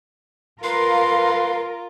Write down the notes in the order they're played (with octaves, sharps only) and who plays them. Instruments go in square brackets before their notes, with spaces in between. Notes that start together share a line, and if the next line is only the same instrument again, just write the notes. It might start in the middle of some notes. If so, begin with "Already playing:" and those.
[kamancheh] F4 [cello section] A#4 [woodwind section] B4 C6 [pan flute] F5